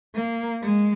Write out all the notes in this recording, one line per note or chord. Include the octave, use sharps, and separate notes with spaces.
A#3
G#3